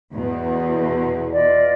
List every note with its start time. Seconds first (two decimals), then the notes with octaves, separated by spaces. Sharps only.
0.12 E2 B2
1.30 F4 D5 D#5